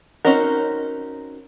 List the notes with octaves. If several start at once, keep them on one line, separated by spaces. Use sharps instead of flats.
C4 C#4 D#4 F#4 A#4